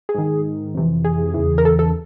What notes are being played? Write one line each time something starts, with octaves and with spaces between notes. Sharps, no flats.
G#4
G#2 D#3
F2 C3 E3
G#4
E2 C#3 E3
A#4
A4
A4